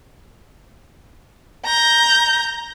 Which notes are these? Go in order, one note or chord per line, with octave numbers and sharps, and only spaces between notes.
A#5 G6